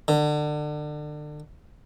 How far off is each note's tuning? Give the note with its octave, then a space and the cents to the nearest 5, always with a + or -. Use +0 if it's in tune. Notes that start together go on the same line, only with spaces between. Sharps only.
D3 +30